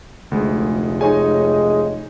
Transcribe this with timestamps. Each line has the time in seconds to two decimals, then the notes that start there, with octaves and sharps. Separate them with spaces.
0.32 F1 D2 G#3
1.01 G#3 D#4 C#5 G#5